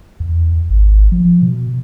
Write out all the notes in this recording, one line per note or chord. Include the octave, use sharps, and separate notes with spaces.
E2
G#1
F3
B2